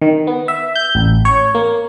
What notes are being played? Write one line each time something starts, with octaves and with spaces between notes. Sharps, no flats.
D#3
B3
E5
G6
A1
C#5
A#3